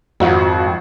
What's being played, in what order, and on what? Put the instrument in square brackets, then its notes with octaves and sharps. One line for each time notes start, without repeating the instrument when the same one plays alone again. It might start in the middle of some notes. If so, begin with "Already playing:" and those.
[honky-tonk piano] G#1 F3 F#4 [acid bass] F2